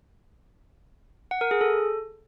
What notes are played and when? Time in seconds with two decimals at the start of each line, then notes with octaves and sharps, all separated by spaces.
1.31 F#5
1.41 A#4
1.51 G#4
1.61 A4